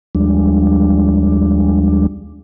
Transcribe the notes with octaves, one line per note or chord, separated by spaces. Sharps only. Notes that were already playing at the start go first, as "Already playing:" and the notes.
D#2 F3 G3 G#3 D4